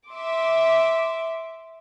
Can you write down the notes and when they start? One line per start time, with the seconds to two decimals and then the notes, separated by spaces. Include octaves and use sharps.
0.10 E5 C6 D6